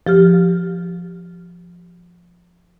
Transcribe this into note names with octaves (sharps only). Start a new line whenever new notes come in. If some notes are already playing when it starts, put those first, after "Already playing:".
F3 G4 F6